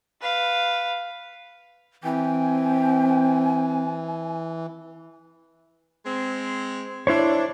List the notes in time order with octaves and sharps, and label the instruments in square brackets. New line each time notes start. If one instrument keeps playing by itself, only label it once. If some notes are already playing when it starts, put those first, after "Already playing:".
[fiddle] B4 F5
[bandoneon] E3 [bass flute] C4 [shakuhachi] G5 [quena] G#5
[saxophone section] G#3 C4
[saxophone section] D4 [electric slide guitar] E4 C5 C#5